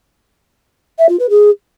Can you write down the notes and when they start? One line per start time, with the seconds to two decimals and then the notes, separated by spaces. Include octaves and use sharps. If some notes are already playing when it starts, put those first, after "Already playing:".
0.98 E5
1.09 F4
1.19 B4
1.30 G#4